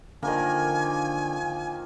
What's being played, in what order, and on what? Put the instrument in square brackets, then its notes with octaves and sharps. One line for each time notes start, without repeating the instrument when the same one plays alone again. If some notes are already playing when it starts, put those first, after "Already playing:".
[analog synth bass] D3 [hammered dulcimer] D#3 F3 A#3 [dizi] G#5